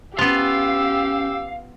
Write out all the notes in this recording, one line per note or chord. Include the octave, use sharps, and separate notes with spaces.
B3 C#4 F4 G4 F5 E6